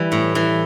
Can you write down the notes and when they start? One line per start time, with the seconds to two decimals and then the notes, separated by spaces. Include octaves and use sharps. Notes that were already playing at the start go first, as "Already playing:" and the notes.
Already playing: E3 G3
0.12 A2
0.35 E3